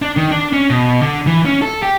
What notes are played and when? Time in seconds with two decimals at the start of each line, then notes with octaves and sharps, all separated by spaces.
0.02 D4
0.17 D#3
0.31 D4
0.53 C#4
0.70 B2
1.01 D3
1.27 E3
1.46 C#4
1.62 A4
1.83 G4